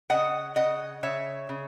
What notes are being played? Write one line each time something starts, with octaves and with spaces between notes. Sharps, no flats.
C#3 D#5 F#5
C#3 D#5 F#5
C#3 C#5 E5
C#3